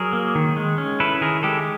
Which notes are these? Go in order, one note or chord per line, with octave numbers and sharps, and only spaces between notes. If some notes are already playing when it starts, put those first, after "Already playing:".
Already playing: F#3 G#4 A#4
A#3
D#3
G#3
C#4
E4 A4 B4
D#3 G#4 A#4
G#3 G4 A4